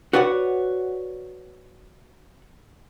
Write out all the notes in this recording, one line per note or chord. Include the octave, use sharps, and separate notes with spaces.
F#4 B4 C#5 D5 F#5